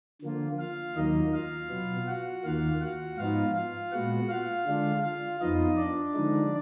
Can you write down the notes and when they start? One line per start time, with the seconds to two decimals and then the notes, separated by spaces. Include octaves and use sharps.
0.22 D3 F3 A#3 F4
0.59 F4 F5
0.95 D#2 D#3 F#3 A#3 D#4 D#5
1.33 F4 F5
1.70 B2 F#3 B3
2.07 F#4 F#5
2.44 D#2 D#3 A#3 F4 F5
2.81 F#4 F#5
3.18 G#2 F3 B3 D#4 F4 F5
3.55 F4 F5
3.92 A#2 G#3 B3 F#4 F#5
4.29 F4 F5
4.66 D3 G#3 D4 F4
5.03 F4 F5
5.40 F2 F3 B3 D#4 F4 D#5
5.77 D4 D5
6.15 D3 F3 G#3 D#4